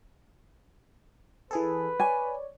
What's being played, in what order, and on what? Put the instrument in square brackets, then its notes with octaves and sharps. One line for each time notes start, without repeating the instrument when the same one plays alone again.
[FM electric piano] E3 G#4 A4 [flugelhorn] B4
[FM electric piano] C#5 D5 [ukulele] G#5